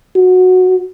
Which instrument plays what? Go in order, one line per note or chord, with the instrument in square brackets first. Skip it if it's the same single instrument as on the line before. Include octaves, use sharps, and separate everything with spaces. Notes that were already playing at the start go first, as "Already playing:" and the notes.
[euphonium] F#4